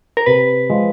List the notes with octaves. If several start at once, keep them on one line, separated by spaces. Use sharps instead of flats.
A#4
C3 B4
F3 G#3